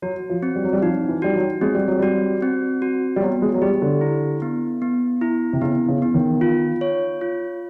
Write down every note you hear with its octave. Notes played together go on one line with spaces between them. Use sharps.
F#3 F#4
F3
C4
G3
F#3
G3
F3 D#4
E3
G3 F#4
F#3
G#3 C4
G3
F#3
G3 F#4
C4
F#4
G3
F#3 B3
G#3
F#3
G3 G4
D3
E4
B3
B3
E4
C3
C#3 B3
C#3
E3 B3
D#3
F4
C#5
F4